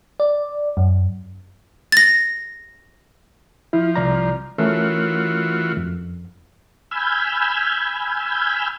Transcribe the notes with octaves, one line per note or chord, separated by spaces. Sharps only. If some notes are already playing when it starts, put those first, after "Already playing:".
D5
F#2
A6 A#6
F3 E4
C2 D5 A#5
E3 A3 C#4 F4 F#4 A#4
F2
G#5 B5 E6 F6 G6 G#6